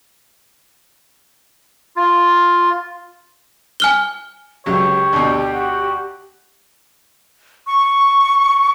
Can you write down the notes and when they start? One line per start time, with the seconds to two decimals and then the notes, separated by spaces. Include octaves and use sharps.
1.96 F4
3.80 G#5 F6 G7
4.66 C#2 F#3 G4 C#5
5.13 D2 B2
5.53 F#4
7.67 C#6